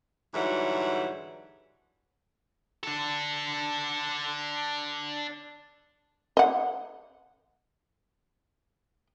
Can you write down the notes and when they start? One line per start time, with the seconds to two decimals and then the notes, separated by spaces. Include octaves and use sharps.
0.34 G#2 D3 E3 F#3 G3 F#5
2.84 D4 A4
6.37 D#5 F#5